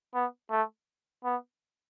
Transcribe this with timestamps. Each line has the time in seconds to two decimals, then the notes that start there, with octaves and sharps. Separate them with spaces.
0.14 B3
0.51 A3
1.24 B3